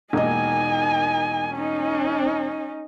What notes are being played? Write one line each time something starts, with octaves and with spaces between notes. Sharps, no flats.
E1 A#3 D#4 D#5 G#5
C#4 D#4